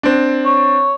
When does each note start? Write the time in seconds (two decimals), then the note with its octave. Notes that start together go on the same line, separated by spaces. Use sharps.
0.03 C4 D4
0.45 C#5